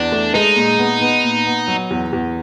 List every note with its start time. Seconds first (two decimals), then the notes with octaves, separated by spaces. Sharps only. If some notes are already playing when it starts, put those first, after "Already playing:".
Already playing: E2 D4
0.12 A3
0.34 G#3 D#4
0.56 A#2
0.78 B3
1.01 B3
1.23 A#2
1.46 B3
1.68 F#3
1.91 E2
2.13 E2